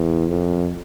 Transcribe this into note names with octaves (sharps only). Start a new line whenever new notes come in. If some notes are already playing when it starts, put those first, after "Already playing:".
Already playing: E2
F2